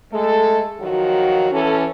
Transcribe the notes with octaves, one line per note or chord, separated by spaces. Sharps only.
G#3 A3 A4
F2 D#3 F3 F#3 F4 F#4
E3 C#4 A4